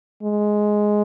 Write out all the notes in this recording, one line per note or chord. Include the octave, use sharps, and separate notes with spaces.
G#3